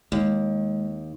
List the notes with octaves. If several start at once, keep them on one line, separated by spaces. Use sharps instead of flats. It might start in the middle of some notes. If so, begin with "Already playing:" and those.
D#2 G#3